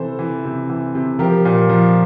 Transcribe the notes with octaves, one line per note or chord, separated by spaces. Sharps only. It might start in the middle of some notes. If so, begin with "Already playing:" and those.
Already playing: C3 E3 A4 C5
E3
C3
E3
C3
F3 G4 A#4
A#2
F3